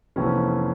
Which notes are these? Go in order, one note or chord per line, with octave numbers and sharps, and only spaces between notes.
F1 F2 E3 A#3 C#4